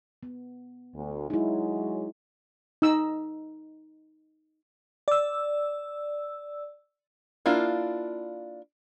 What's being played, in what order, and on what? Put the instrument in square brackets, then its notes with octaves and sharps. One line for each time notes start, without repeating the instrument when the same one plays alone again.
[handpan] B3
[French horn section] D2
[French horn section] F#3 G#3 [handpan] D#4 E4
[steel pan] D#4 E6
[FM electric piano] D5 E6
[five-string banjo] A#3 D4 E4 F4